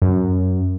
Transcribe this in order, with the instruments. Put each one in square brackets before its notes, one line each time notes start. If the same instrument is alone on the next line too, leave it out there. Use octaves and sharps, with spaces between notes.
[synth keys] F#2